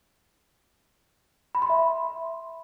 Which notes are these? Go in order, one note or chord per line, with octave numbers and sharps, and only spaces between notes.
B5
C6
E5